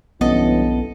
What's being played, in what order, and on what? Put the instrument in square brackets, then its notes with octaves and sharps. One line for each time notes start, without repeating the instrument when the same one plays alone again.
[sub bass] B1 [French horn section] G2 E3 C#4 [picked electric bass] B3 [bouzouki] A4 D#5